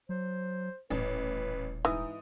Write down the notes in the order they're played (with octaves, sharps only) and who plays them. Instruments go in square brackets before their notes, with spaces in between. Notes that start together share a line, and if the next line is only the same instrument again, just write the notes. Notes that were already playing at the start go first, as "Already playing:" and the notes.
[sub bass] F#3 [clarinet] C5
[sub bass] D#1 [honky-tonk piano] A1 [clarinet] B4
[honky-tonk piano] G#2 D#6 [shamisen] E3 [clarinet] D#4